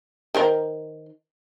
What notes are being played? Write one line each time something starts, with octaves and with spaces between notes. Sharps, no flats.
D#3 A#4 C5